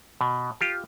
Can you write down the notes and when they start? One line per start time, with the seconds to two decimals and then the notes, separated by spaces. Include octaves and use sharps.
0.21 B2
0.61 F4 G4